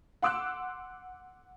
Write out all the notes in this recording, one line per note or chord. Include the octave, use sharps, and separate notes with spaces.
F#5 C6 D6 E6 F#6